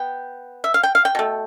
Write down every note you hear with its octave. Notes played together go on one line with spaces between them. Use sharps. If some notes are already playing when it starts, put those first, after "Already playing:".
Already playing: B3 G5
E5
F5
G5
F5
G5
B2 A3